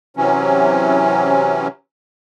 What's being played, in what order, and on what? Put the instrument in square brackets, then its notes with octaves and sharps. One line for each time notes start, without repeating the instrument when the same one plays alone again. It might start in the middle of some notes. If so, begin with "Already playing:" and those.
[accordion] C3 E3 F#3 C#4